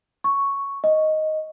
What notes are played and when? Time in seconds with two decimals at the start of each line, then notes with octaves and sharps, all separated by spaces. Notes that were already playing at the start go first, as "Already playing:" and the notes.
0.24 C#6
0.84 D#5